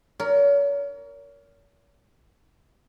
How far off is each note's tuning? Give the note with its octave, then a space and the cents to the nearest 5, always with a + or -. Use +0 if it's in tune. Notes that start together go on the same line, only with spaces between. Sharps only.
A#4 +0 C#5 +40